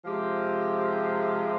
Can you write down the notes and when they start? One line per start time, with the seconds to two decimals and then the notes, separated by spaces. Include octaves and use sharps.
0.05 C3 F3 G#3 G4
0.75 G4